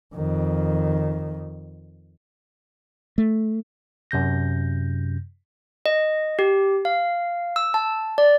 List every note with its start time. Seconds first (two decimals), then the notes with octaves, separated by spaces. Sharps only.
0.14 F2 D#3
3.18 A3
4.11 F#2 C3 G6 A#6
5.86 D#5
6.39 G4
6.85 F5
7.56 E6
7.74 A5
8.18 D5